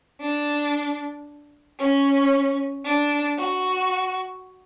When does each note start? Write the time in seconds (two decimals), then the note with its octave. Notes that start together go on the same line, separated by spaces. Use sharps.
0.20 D4
1.79 C#4
2.84 D4
3.37 F#4